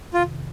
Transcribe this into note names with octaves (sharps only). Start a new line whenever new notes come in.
F2 C3 D#3 F4